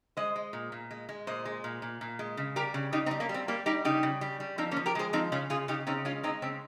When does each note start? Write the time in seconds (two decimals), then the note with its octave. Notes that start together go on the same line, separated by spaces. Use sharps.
0.17 G#3 C5 D#5
0.36 G#3
0.53 A#2
0.72 A#2
0.91 G#3
1.09 G#3
1.27 A#2 C5 D#5
1.45 G#3
1.64 A#2
1.82 A#2
2.01 A#2
2.19 G#3
2.37 C#3
2.56 G3 G4 A#4
2.74 C#3
2.92 C#3 D#4 G4
3.06 C4 D#4
3.11 G3
3.20 A#3 C#4
3.29 G3
3.34 C4
3.48 G3 A#3
3.66 G3 D#4 G4
3.85 C#3 D#4 G4
4.03 C#3
4.21 G3
4.40 G3
4.58 F3 C4 D#4
4.71 A#3 C#4
4.76 F3
4.86 G4 A#4
4.95 G#3 G#4 C5
5.13 F3 C4 D#4
5.32 C#3 C#4 F4
5.50 C#3 F4 G#4
5.68 C#3 D#4 G4
5.87 C#3 C4 D#4
6.05 G#3 C#4 F4
6.23 G#3 C4 D#4
6.42 C#3 C4